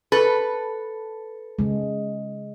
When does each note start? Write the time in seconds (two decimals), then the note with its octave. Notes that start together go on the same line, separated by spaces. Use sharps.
0.12 A4 B4
1.59 C#3 G#3